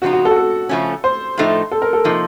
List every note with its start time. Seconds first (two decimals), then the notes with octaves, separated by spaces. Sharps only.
0.02 C#3 F3 C4 D#4 F#4
0.13 F#4
0.25 A4
0.31 F#4
0.36 A4
0.69 C#3 F3 A3 C#4
1.04 C5
1.38 A2 F3 A3 D#4
1.71 A4
1.82 A#4
1.93 A4
2.04 C3 F3 A#3 D#4